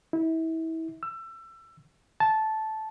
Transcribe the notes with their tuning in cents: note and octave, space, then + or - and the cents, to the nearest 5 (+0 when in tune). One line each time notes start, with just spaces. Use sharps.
E4 -30
E6 +25
A5 -10